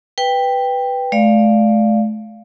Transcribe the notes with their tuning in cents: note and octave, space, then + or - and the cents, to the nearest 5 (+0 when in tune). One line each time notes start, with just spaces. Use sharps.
B4 +0 G5 +5
A3 -40 D5 +0 F5 -5